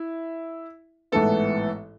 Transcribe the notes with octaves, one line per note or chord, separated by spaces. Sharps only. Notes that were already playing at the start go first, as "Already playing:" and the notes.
Already playing: E4
A1 G#2 E3 B3 A4